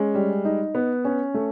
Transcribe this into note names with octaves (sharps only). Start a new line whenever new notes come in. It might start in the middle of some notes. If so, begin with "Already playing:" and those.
Already playing: G#3 C#4
G3
D#4
B3
C#4
A3